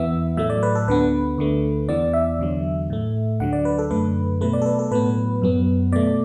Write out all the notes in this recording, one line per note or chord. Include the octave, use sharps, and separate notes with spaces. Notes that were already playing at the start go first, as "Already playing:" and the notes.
Already playing: E2 E3 B3 E5
A2 F#3 A3 E5
D5
B4
A4
D2 D3 B3 B4
D2 D3 A3
E2 E3 B3 D5
E5
E2 D3 F#3
A2 A3
D2 D3 F#3 F#5
D5
B4
A4
F#2 D3 A3 B4
B2 F#3 A3 B4
D5
A4
B4
A4
A2 F#3 B3 B4
F#2 F#3 B3
B2 A3 D5